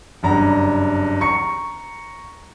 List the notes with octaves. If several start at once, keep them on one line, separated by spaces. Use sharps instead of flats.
F#1 G2 A#5
A#5 C#6 C#7